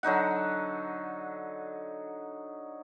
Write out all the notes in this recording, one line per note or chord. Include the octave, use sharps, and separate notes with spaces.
D3 F#3 D#4 F#5